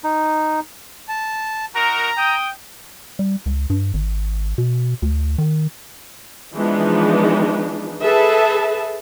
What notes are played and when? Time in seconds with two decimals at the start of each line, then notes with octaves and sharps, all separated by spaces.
0.04 D#4
1.09 A5
1.75 D#4 F#4 A#4 A#5
2.18 G5 D#6
3.19 G3
3.46 C#2
3.70 G2
3.94 G#1
4.58 B2
5.02 D2
5.38 D#3
6.55 E3 F3 G#3 B3 D4 D#4
8.03 G#4 A4 B4 E5 A5